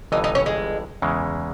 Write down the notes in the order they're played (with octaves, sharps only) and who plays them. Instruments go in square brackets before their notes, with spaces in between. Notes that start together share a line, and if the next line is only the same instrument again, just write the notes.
[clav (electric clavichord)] G1 G2 E3 [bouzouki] D#4
[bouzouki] D#4
C#4
G#3
[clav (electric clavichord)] E2 C#3 E3 G#3